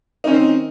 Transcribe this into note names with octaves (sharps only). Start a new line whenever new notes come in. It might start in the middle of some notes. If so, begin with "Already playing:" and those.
D#3 C4 C#4 D#4